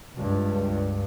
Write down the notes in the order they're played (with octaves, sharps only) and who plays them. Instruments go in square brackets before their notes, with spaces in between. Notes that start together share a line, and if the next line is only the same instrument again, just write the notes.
[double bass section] C#2 G2